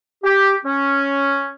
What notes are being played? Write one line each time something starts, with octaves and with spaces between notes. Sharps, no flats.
G4
C#4